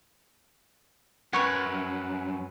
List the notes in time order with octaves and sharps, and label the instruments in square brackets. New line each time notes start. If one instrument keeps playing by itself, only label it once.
[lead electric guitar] F#2 [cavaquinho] B4 C#5 G#5 [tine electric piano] F#5 C#6 F#6